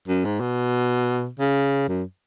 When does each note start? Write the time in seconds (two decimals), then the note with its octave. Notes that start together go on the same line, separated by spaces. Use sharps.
0.08 F#2
0.25 G#2
0.41 B2
1.39 C#3
1.88 F#2